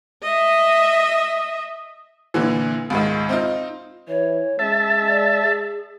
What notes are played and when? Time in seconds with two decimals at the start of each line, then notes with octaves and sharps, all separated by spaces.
0.22 D#5 E5
2.34 A#2 D3 E3
2.90 C#2 G#2 D#3
3.29 C4 D#4 F4
4.08 E3 C#5
4.59 G#3 C#4 E5 A5
5.07 D5
5.42 G#4